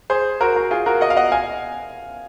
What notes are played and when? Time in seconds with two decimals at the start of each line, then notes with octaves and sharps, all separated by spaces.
0.10 G#4 C5
0.41 F#4 A#4
0.56 F#4 A#4
0.71 F4 G#4
0.86 F#4 A#4
1.01 D#5 F#5
1.10 F5
1.17 D#5 F#5
1.32 F5 G#5